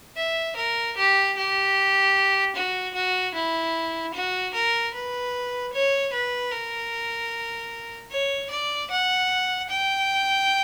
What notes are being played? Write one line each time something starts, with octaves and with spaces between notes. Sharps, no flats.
E5
A#4
G4
G4
F#4
F#4
E4
F#4
A#4
B4
C#5
B4
A#4
C#5
D5
F#5
G5